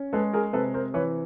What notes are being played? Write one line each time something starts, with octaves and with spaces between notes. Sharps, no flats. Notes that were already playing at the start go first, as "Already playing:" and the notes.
Already playing: C#4
G#3 A4 B4
G#4 A#4
C3 A4 B4
A#4 C5
E3 B4 C#5